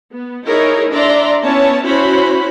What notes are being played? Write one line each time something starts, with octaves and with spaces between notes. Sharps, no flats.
B3
D#4 E4 G#4 A#4 C#5
D4 D5 E5 A#5 C6
B3 C#4 E4 C#5 A5
C#4 E4 F#4 C5 C#5 B5